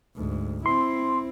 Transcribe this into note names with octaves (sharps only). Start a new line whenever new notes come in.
D2 G#2
C4 E4 C6